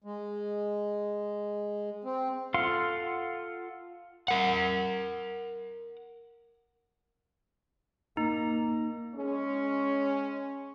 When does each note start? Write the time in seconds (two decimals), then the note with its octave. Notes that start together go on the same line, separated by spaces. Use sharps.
0.04 G#3
2.04 C4
2.54 F4 A4 F5 F#5 C6
4.28 A#4 F#5
8.17 A#3 D#4
9.15 G#3 C#4